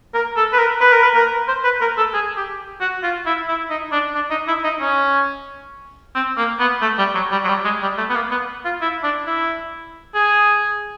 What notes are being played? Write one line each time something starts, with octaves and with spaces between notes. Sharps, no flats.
A#4
A4
B4
A#4
B4
A#4
B4
A#4
C5
B4
A#4
A4
G#4
G4
F#4
F4
E4
E4
D#4
D4
D4
D#4
E4
D#4
C#4
C4
A#3
B3
A3
G3
F#3
G3
F#3
G3
G#3
G3
A3
B3
A#3
B3
F4
E4
D4
E4
G#4